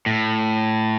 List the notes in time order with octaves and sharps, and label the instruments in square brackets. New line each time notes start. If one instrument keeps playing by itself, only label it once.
[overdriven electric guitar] A2